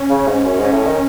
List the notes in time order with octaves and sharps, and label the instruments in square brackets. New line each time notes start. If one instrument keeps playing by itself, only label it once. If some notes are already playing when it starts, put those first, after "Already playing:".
Already playing: [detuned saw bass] C#4
[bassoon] C#3
G#2
F#2
G#2
A2
D#3